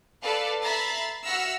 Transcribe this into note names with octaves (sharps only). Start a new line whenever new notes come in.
A4 B4 D5 F5
E5 A#5 B5 A6 C7
F#4 E5 F#5 E6 F6 A#6